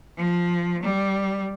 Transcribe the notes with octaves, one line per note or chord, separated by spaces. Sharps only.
F3
G3